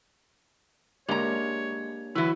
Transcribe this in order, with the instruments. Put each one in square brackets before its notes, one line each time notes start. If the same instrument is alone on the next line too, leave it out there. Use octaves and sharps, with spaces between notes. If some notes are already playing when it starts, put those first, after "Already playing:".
[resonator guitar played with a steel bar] G#3 A#5 [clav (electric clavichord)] A#3 D4 G4 [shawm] C#5
[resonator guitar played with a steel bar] E3 F#3 [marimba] E4 [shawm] B4